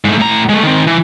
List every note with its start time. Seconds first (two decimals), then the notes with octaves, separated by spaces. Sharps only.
0.05 G#2 A3
0.18 A2 A#5
0.49 G#3 A3
0.63 D#3 C4
0.87 E3